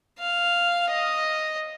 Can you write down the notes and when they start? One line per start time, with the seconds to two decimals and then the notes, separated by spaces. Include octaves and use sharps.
0.19 F5
0.90 D#5